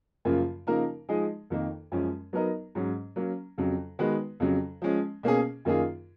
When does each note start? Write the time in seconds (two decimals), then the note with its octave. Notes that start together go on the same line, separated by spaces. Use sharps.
0.25 F#2 C#3 F3 A#3 F4
0.67 C#3 F3 A#3 D#4 A#4
1.09 F3 G#3 D#4 G#4 D#5
1.50 F2 D#3 A#3
1.92 F#2 F3 G#3 C#4
2.33 F#3 B3 D#4 A#4 D#5
2.75 G#2 F#3 C#4
3.16 F#3 A#3 C#4
3.58 F2 C#3 F#3
3.99 D#3 G#3 B3 F#4 B4
4.40 F2 C#3 F#3
4.82 F3 G#3 C#4
5.23 B2 A#3 C#4 G#4
5.65 F#2 D#3 A#3 F4 G#4